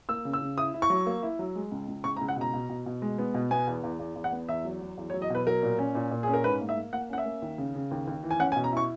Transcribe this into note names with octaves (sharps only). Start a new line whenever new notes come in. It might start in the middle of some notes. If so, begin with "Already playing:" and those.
A#3 E6
C#3
E6
C#3
E4 D#6
E4
C#6
F#3
A#3
E4
F#3
G#3
C#2
C#2
C#2 C#6
A#5
C#2
F#5
B2 A#5
B2
B2
B2
G#3
B3
B2
B3 G#5
E2
E2
E2
E2
F#5
B3
E2 E5
F#3
F#3
E2
C#5
F#3
D#5
B2 B4
F#3 A#4
A#2
C#4
A#2
A#2
C#4 G#4
A#4
G#2 B4
A#3
E5
A#3
A#3 F#5
C#4 F#5
E5
A#3
D#2
C#3
C#3
D#2
D#2
E3
G#5
C#4 F#5
G#5
B2
A#5
E4 C#6